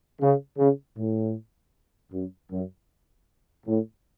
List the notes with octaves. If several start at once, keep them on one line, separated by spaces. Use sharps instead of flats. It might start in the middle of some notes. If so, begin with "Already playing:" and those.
C#3
C#3
A2
F#2
F#2
A2